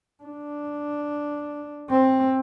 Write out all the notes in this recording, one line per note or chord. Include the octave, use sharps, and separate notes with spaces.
D4
C4